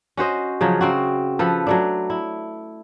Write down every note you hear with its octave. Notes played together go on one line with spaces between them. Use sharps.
C#4 F#4 C5 D#5
C#3 F3 F#3
C#3 C4 F#4
F3 A4 B4 F#5
F#3 A3 D4
E4